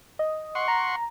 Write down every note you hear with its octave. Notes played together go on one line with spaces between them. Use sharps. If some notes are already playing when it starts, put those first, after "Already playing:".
D#5
F#5 C6 C#6
A#5